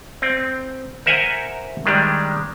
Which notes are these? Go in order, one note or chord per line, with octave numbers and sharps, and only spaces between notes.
C4
A#4 C5 E5 F#5 G#5 A#5
D#3 G3 G#3 D4